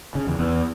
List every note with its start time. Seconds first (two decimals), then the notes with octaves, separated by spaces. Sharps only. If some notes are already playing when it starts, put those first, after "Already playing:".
0.15 C#3
0.27 E2
0.39 E2